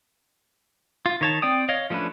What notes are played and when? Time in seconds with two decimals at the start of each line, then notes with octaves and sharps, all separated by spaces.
1.06 F4
1.21 D#3 C#5 A5
1.42 C4 D5 G5 D#6
1.69 C#5 D#5 F5
1.90 F3 A3 C#4 D4 B4